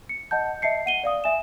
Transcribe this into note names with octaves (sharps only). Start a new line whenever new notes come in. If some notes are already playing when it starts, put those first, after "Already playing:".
C#7
D#5 F#5 A5 G6
D#5 E5 A5 C7 C#7
F#5 D#7 G7
D5 F5 D#6
E5 G#5 E7